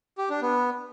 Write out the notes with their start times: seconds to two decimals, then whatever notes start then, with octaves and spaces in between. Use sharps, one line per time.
0.18 G4
0.30 D4
0.42 B3